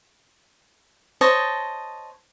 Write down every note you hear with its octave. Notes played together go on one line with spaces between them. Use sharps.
C5 C#5 D#5 A5